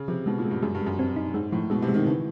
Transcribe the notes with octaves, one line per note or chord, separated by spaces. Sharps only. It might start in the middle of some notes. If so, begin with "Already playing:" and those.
Already playing: C#3
C3 F3
B2 G#3
A#2
G#3
G2
F#2 G#3
G2
G#3
F#2
G2 C4
D#4
G#2 G#3
A2 F3
B2 G#3
C3
G#3
D#3
C#3 E3